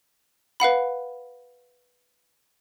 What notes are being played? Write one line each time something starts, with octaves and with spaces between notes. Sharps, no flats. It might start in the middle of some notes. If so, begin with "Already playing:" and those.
B4 F5 F#5 B5